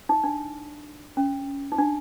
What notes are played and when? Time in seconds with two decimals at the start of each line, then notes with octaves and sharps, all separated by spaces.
0.09 D#4
0.24 D4
1.17 C#4
1.72 D#4
1.78 D4